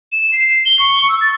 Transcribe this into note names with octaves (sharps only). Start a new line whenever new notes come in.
E7
C7
G7
C#6
E6
A6